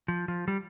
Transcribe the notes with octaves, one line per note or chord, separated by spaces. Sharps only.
F3
F3
G3